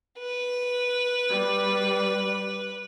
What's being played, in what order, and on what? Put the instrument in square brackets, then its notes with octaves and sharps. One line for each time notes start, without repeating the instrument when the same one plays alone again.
[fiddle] B4
[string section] G3